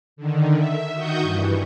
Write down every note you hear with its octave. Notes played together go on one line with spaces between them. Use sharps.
D3 D#3
E5
D#3 F#4 C#6 D#6 G6
G2 E3